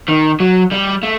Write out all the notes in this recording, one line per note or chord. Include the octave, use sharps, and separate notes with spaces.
D#3
F#3
G3
A3